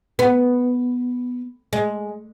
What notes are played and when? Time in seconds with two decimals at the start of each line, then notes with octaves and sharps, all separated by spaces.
0.19 B3
1.73 G#3